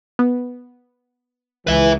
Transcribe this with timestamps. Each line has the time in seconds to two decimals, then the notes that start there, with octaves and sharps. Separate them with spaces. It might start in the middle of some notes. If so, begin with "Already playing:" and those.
0.19 B3
1.67 C#2 E3 B4 E5